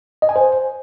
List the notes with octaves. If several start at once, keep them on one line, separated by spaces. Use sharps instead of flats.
D#5
G#5
C5